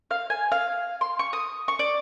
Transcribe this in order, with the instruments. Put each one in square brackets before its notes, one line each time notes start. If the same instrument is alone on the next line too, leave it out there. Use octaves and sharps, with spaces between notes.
[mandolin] F5
G#5
F5
C6
C#6
D#6
C#6
D5